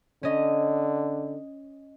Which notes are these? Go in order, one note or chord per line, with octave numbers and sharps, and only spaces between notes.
D3 C#4 D#5